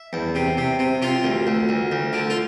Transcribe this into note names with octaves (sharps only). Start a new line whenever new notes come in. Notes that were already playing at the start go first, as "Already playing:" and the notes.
Already playing: E5
E2
C3
C3
C3
C3 F4
D2
D2
D2
D2
D3
F4